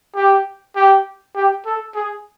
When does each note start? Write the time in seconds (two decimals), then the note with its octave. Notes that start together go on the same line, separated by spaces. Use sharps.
0.15 G4
0.75 G4
1.35 G4
1.65 A4
1.95 G#4